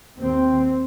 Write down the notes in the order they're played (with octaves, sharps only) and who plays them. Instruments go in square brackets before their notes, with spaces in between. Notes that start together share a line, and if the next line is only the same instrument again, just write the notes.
[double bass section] D#2 C4